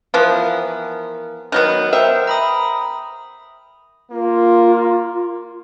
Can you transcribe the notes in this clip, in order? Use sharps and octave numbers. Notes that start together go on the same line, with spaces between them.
E3 F3 B3 A#4
D#3 F#3 B3 F#6
A#4 C5 E5 G5
A#5 B5 D#6
A#3 F4